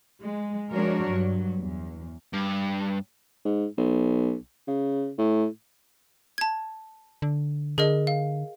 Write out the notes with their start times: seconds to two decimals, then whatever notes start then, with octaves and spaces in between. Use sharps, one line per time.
0.23 G#3
0.71 F3 G#3 D4 F#4 A#4 C#5
1.09 G2 F#3
1.59 E2
2.33 G2
3.45 G#2
3.78 B1
4.68 C#3
5.18 A2
6.38 A5 G#6
7.22 D3
7.78 D3 G#4 A#4 D#5
8.07 F5